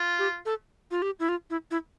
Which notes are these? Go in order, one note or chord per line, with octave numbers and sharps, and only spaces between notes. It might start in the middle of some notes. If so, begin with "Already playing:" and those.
Already playing: F4
G4
A4
F4
G4
E4
F4
E4
E4